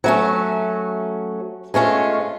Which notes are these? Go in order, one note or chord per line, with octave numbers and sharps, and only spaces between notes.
F#3 A3 C#4
G#3 A3 C#4 F4